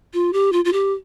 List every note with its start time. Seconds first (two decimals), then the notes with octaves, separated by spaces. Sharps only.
0.14 F4
0.33 G4
0.52 F4
0.65 F4
0.73 G4